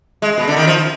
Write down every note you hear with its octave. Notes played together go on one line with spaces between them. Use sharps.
G#3
B2
D3
D#3
F3